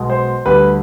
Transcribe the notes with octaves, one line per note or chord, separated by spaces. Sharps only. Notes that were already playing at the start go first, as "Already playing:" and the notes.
Already playing: B1 B2 G#3
C5
D2 D3 G3 B4